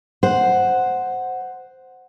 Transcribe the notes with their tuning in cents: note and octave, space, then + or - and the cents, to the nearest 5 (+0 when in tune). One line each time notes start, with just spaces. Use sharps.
C5 +0 F#5 +0